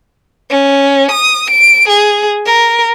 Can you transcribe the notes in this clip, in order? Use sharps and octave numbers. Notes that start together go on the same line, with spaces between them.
C#4
D#6
D7
G#4
A#4